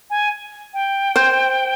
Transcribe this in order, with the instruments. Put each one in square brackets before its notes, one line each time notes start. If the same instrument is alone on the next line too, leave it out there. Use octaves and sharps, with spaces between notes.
[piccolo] G#5
G5
[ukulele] C5